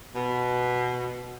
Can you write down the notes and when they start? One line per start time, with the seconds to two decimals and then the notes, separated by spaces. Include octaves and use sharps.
0.15 B2